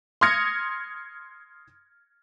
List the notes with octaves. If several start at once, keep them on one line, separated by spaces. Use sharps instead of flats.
C6 D#6 F6 G#6 A#6 C#7